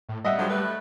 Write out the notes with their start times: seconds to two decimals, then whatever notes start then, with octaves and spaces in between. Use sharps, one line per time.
0.09 A2
0.25 G3 D#5 E5 F#5
0.37 D3 F3 F#3
0.50 A3 B4